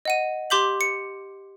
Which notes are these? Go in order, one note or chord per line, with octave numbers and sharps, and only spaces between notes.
D#5 F#5 D#7
G4 C6 D6 G6 B6 F#7
C#7